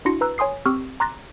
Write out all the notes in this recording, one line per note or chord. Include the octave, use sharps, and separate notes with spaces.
D4 E4 F#4 C6 A#6 C#7
B4 A#5 E6 F#6
C#5 G#5 C6 D#6 C7
C4 G4 C#6 E6 F6
A#5 C6 D6 F#6 A6 A#6